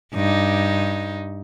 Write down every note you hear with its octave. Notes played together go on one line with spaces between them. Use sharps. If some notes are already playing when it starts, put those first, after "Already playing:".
G2 D#4